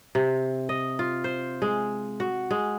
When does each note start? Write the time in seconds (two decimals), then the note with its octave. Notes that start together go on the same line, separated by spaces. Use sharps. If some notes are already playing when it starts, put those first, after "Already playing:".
0.15 C3
0.69 D#5
0.99 F4
1.24 C5
1.62 G#3
2.20 F#4
2.51 G#3